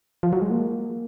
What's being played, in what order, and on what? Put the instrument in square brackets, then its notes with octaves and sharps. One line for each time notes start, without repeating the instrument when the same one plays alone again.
[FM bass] F3
F#3
G#3
A#3